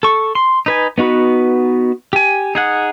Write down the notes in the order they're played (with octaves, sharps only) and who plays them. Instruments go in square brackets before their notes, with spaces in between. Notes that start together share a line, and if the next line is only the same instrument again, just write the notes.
[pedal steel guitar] A4 C#6
C6
D#4 B4 G#5
B3 D#4 F#4 B4
G4 G#5
D#4 G#4 F#5